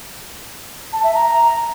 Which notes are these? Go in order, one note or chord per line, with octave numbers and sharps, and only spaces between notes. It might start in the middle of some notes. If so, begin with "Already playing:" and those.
A5
E5
A#5